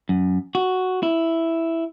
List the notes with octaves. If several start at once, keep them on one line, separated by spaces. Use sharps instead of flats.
F#2
F#4
E4